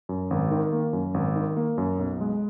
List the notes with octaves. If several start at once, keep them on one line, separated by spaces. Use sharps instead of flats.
F#2
G#1
D#3
A#3
F#2
G#1
D#3
A#3
F#2
B1
G#3